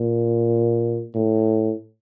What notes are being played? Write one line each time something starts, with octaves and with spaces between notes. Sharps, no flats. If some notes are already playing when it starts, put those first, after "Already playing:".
Already playing: A#2
A2